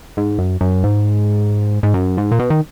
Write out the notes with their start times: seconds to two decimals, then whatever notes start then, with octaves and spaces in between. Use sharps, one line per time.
0.17 G#2
0.38 F#2
0.61 F#2
0.84 G#2
1.83 G#2
1.94 F#2
2.17 G#2
2.31 A#2
2.39 B2
2.50 D#3